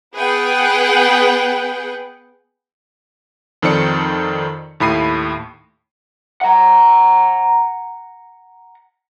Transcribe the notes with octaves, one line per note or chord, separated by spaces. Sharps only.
B3 G#4 B4 F#5 G5
F2 D#3 A4 C5 D5 C#7
D#2 A2 B5 C7 D#7
F#5 A#5